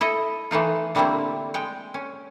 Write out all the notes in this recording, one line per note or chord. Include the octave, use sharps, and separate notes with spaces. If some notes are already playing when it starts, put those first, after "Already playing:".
E4 A4 D#5
E3 A3 D#4 F4
D3 G3 A3 A#3 C4 E4
G#3 G5
C#4